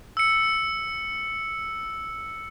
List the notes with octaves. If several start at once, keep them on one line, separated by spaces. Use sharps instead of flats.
E6 C#7